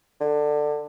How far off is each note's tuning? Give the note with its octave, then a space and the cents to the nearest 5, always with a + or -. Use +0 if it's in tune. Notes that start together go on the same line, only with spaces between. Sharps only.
D3 +15